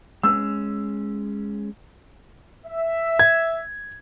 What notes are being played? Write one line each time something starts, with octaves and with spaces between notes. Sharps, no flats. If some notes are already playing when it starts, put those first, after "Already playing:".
G#3 C#4 E6
E5
G#6